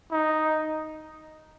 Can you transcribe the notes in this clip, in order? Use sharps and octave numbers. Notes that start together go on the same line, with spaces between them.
D#4